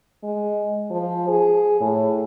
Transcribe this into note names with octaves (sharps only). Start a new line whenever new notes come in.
G#3
F3
G#4
A2